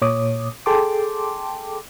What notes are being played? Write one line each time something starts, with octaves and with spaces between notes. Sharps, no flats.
A#2 C#5 D6 D#6
G#4 A4 G5 A5 C6 D6